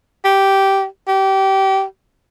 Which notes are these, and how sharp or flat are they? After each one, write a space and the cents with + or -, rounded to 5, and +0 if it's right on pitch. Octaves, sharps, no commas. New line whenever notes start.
G4 -10
G4 -25